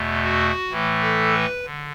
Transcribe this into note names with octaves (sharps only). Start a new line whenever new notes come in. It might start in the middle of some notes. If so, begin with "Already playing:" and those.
Already playing: E2 B2 A3
F#4
A2 E3 A3
A4
B4
D3